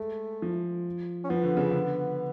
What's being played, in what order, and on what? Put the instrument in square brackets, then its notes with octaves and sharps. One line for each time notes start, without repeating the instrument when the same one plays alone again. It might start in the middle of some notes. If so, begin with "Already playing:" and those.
Already playing: [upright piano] G#3 [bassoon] A3
[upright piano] F3
[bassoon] C#4
[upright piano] F3 [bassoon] B3
[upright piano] D3
C#3
D3